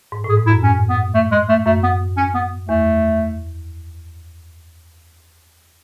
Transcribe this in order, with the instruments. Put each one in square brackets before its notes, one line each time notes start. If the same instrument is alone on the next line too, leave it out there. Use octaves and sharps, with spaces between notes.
[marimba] G#2
A2
[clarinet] G#4
[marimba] G#2
[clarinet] E4
[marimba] F#2
[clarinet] C#4
B3
A3
G#3
A3
[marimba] F#2 [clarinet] A3
[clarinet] B3
C#4
B3
[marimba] E2 [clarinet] A3